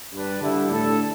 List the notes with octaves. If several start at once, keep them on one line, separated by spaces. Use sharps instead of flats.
G2 G3 D4 B4
D3 G3 E4
A2 A3 D4 A4